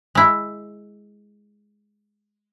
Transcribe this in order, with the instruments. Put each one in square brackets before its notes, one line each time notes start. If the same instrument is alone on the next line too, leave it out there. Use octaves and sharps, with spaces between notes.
[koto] G#3 E4